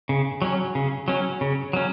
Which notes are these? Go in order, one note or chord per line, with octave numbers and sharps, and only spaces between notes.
C#3
F#3 C#4
C#3
F#3 C#4
C#3
F#3 C#4